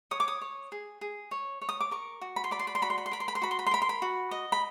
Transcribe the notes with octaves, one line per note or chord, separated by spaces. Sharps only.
C#5 D#6
D6
D#6
C#5
G#4
G#4
C#5
C#5
D#6
D6
A#4 C#6
F#4
B5
C6
D5 B5
C6
B5
C6
F#4 B5
C6
B5
C6
A#4 B5
C6
B5
C6
F#4 B5
C6
B5
C6
A#4 B5
C6
B5
F#4
D#5
B5